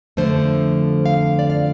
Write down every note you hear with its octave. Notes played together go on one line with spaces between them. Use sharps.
F2 D3 F3 A3 C5
F5
D5
F5